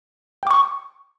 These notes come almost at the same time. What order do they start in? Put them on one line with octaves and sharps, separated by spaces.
G5 D6 C#6